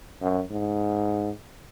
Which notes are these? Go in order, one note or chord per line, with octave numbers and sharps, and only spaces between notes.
F#2
G#2